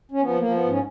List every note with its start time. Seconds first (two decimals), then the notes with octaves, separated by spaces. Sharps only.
0.11 C#4
0.22 F3 B3
0.37 A#3
0.42 F3
0.53 B3
0.63 G#2
0.68 C#4